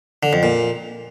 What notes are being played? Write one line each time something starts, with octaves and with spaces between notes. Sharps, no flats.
D3
F2
A#2